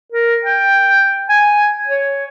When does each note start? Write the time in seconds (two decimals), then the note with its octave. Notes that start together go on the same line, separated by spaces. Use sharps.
0.12 A#4
0.45 G5
1.29 G#5
1.87 C#5